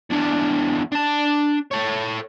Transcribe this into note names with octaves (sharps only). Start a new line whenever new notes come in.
E2 D4
D4 A5
A4 C#5